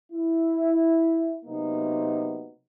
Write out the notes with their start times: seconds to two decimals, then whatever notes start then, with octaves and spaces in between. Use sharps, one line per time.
0.12 E4
1.44 C3 F#3 A#3 B3 D#4